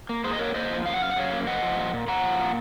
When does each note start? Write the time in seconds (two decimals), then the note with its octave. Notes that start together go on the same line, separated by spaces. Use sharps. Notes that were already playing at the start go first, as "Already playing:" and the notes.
0.09 A#3
0.24 A#3 G#4 C5
0.33 D#5
0.39 A#3 A#4 C#5
0.55 A#3 C5 D#5
0.70 F3
0.85 F#2 F5
0.94 F#5
1.01 F#2 F5
1.10 F#5
1.16 F#2 C#5 F5
1.32 A#3
1.47 F3 D#5 F#5
1.63 F3
1.78 A#2
1.93 A#2
2.08 A#2 F#5 A#5
2.23 F3
2.39 A#2